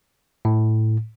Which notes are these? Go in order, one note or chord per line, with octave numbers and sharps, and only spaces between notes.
A2